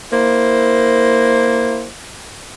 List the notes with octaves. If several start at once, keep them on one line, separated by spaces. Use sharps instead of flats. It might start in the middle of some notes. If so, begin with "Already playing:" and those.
A#3 E4 C5